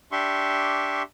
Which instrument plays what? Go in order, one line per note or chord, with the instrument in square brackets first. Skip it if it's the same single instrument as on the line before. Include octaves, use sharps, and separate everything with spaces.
[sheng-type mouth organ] D4 G4 E5 C6 C#6